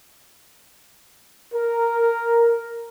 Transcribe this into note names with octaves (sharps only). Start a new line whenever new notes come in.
A#4